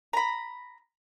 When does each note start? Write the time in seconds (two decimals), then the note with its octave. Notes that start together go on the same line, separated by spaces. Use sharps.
0.13 A#5 B5